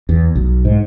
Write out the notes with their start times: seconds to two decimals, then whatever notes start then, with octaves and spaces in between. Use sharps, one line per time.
0.09 E2
0.35 B1
0.65 G#2